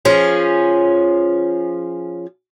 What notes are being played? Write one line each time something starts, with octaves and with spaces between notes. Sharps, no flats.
F3 C#4 G#4